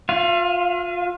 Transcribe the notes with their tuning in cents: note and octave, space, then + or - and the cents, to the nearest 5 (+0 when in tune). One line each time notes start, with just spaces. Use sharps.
F4 +25 F5 -40